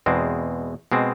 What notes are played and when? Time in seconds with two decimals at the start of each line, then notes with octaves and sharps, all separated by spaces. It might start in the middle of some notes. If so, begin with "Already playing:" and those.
0.06 E2 B2 G#3 C4
0.92 B2 G#3 C4